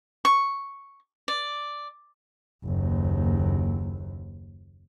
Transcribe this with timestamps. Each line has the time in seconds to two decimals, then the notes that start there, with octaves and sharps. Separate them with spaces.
0.25 C#6
1.28 D5
2.65 F#1 D#2